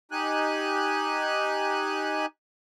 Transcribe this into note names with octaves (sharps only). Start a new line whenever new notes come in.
D#4 G4 G#5 F#6